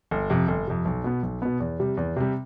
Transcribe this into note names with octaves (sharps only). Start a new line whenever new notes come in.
G1
F2 C3
G1
F2 C3
B1
B2 B3
B1
B2 B3
E2
C3 G3
E2
C3 G3